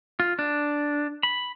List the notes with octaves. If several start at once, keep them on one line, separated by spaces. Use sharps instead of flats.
F4
D4
B5